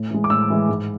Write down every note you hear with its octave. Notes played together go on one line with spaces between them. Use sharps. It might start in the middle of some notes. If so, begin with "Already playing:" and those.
Already playing: A2
E3 G#3
D6
A2 E6
E3 G#3
G#2